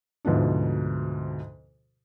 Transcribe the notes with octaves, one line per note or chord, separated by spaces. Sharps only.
D2 G#2 B2 F3 D4